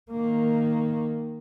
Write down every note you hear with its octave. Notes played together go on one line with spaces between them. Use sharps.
D#3 A#3